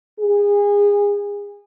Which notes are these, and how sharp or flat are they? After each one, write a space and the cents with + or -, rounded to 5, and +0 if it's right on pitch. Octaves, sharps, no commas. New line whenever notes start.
G#4 -30